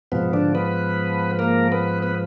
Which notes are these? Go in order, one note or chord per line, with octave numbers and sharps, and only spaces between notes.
G#2 B2 F3 B3
D3 D4
B3 B4
A#3 A#4
B3 B4
B3 B4